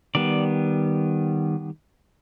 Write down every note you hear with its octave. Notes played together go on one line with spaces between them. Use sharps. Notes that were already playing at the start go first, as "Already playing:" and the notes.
D#3 G3 B3 D5